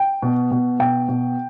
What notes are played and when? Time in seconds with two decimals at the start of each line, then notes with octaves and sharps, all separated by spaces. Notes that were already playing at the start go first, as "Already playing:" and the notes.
Already playing: G5
0.22 B2
0.51 B2
0.79 B2 G5
1.09 B2